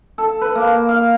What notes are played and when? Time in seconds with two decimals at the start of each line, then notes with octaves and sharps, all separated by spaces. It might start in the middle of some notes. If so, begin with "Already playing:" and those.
0.18 A4
0.41 B4
0.55 A#3
0.89 F5